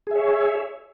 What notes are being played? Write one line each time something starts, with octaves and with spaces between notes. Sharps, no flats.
G#4 C#5 E5